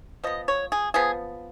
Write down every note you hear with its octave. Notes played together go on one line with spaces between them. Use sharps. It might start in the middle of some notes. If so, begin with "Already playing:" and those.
F3 B3 D#5
C#5
G#4
F3 B3 G#4